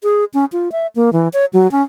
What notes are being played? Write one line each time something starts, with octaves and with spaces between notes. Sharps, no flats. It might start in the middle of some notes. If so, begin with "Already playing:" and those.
G#4
C#4
F4
E5
A#3
E3
C#5
F#3
C#4